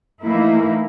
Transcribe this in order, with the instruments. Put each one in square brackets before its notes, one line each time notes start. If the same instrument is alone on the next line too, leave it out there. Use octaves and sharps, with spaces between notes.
[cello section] E3 A3 A#3 D#4 E4